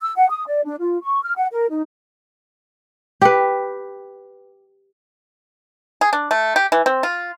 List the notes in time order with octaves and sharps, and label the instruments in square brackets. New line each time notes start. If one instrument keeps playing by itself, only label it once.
[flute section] E6
F#5
D#6
D5
D4
F4
C#6
F6
F#5
A#4
D#4
[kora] G4 B4
[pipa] G#4
D4
A3
G4
E3
C4
F4